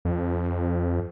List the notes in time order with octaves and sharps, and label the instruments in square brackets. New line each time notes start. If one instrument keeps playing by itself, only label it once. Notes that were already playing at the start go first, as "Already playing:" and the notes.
[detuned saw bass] F2